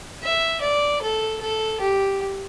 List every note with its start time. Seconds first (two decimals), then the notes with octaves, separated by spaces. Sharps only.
0.23 E5
0.61 D5
1.02 A4
1.41 A4
1.81 G4